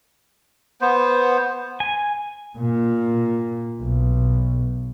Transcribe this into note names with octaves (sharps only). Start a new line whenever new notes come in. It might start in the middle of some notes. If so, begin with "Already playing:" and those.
B3 C5
G#5
A#2
B1